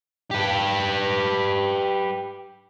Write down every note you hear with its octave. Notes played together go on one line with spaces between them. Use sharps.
G4 B4